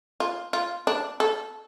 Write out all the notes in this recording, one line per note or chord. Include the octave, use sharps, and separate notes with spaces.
F4
F4
D4
A4